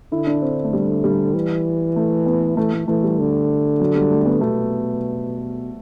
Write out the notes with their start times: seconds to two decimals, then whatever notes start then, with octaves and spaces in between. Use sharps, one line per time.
0.12 D3 E4
0.27 D4
0.42 C4
0.64 A3
0.73 G3
1.04 G3
1.35 E3
1.96 A3
2.26 B3
2.57 E3 A3
2.73 A3
2.88 E3 A3
3.03 G3
3.19 D3
3.80 F#3
3.95 G3
4.11 A3
4.21 A3
4.26 B3
4.41 B2 A3